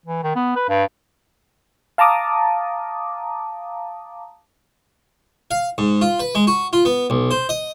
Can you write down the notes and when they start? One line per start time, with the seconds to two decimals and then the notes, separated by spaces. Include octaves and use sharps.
0.06 E3
0.23 D#3
0.36 B3
0.56 B4
0.69 G2
1.98 F5 A5 A#5 D6 D#6
5.51 F5
5.78 G#2
6.01 F4
6.20 B4
6.35 G#3
6.47 F#4
6.73 F4
6.85 B3
7.10 B1
7.31 C5
7.49 D#5